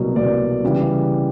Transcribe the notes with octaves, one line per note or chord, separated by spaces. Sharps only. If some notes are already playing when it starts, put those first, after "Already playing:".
Already playing: C2 B2 F#3 A#3
C2 B2 F#3 A#3 D5
C#3 E3 G3